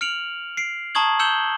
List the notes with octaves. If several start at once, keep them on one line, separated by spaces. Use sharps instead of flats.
F6 C#7 D7 F7 F#7
C7 D7
A5 A#5 C#6 D#6 G#6 F#7
E6 G6 C#7 E7 F#7 G7